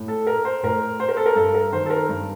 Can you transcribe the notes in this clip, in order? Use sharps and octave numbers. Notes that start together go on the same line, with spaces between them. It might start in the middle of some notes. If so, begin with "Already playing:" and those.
Already playing: A2
A4
A#4
C5
A2 A#4
C5
A#4
A4
A#4
G2 A4
A#4
D#3 C5
A4
A#4
G2